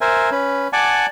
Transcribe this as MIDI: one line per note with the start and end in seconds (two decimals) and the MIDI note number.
0.01 0.30 70
0.01 0.30 72
0.01 0.30 76
0.01 0.30 80
0.31 0.68 61
0.31 0.68 71
0.73 1.06 74
0.73 1.06 78
0.73 1.06 80
0.73 1.06 81
0.73 1.06 86